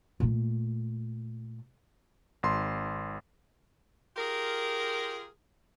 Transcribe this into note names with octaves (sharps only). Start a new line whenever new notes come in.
A#2 A3
G#1 C6
F4 G4 G#4 A#4